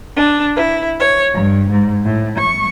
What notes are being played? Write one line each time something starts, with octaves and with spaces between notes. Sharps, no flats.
D4
E4
C#5
G2
G#2
A2
C#6